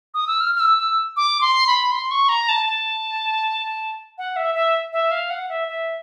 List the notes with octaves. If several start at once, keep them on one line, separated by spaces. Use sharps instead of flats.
D#6
E6
F6
F6
E6
E6
D6
C6
B5
C6
C#6
A#5
A5
A5
F#5
E5
E5
E5
F5
F#5
E5
E5